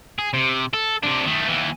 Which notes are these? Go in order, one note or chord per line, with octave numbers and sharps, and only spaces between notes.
G#4
C3
A4
C3 D4
D#3 A3
D#2 E3